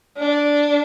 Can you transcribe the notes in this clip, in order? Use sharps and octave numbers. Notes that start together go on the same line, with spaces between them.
D4